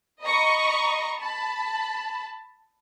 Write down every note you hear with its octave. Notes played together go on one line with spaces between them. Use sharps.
D#5 A#5 B5 C#6
A5 B5